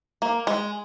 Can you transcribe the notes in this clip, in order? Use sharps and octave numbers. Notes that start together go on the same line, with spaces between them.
A#3
G#3